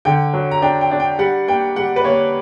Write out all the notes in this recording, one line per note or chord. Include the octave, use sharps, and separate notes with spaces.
D3 G5
F#3
A#5
D4 G5
G5
D4
G5
G3 F#5
A#3 G5
G3 F#5
B4
A#3 C#5